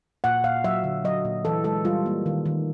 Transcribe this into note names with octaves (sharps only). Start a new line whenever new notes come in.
A#2 F#5
A#2 F5
F#3 E5
D3
F#3 D#5
A#2
E3 A4
G#3 A4
G3 F4
A#3
D#3
D#3